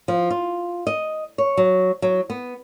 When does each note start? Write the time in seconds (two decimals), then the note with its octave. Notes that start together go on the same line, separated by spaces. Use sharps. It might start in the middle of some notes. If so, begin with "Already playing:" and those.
0.08 F3
0.30 F4
0.87 D#5
1.38 C#5
1.57 F#3
2.02 F#3
2.30 B3